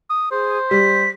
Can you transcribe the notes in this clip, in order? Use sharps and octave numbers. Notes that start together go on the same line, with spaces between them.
D#6
G#4 C5
G3 B6